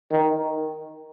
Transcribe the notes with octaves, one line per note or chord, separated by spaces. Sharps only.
D#3